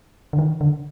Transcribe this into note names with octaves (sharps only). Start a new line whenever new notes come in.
D3
D#3
D3